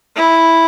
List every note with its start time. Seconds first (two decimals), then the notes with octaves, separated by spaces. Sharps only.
0.16 E4